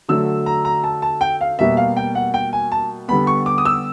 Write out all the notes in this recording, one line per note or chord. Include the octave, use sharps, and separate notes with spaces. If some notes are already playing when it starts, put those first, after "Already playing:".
D3 F#3 A3 E6
A#5
A#5
A5
A5
G5
F5
B2 G3 A#3 E5
F5
G5
F#5
G5
G#5
A5
D3 G3 B3 B5
C#6
D6
D#6
E6